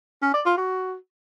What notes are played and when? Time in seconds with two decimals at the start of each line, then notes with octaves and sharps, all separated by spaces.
0.22 C#4
0.34 D5
0.45 F4
0.57 F#4